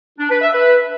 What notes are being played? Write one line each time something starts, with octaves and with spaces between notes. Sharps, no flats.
D4
B4
E5
B4